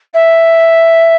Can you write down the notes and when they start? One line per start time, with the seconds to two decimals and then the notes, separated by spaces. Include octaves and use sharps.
0.13 E5